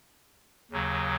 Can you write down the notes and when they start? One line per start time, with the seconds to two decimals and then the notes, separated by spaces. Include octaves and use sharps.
0.71 D#2 C#3 F#3